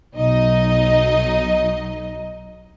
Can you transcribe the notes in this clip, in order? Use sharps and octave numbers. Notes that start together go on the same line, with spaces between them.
B1 F#3 D#4 D#5